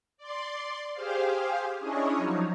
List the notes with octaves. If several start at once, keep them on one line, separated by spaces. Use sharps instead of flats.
D5 C6
G4 G#4 C5 F5
C#4 D4 E4 G#4 C#5 D#5
F3 F#3 D#4